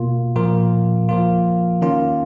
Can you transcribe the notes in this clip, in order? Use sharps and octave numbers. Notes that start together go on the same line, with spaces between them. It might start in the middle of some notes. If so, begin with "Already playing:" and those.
Already playing: B2 A#3 F4
A#2 F3 A#3 F4
F3 A#3 F4
D#3 A#3 C#4 F4